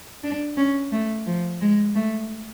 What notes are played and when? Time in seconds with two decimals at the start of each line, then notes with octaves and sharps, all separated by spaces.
0.24 D4
0.57 C#4
0.92 A3
1.26 F3
1.61 G#3
1.95 A3